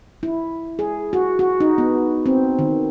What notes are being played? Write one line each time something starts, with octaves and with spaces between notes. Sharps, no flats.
E4
G#4
F#4
F#4
D#4
B3
C4
D#3